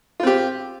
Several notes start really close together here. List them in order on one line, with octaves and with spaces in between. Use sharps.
F4 C4 G4